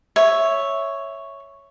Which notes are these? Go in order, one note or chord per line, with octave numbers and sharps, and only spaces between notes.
C#5 E5